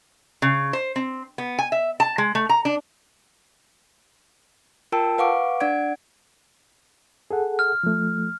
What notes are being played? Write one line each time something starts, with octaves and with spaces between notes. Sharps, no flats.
C#3
C5
C4
B3
G#5
E5
A5
G#3
A3
A#5
D4
F4 A#4 G5 A5 E6 D7
B4 F5 F#5 C#6 D6 D7
D4 D5 F#5 G#6 D7
G#4 A4 F#5
F6
F3 A3